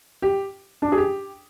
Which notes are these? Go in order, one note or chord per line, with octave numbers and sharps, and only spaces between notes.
G4
D4
G#4
G4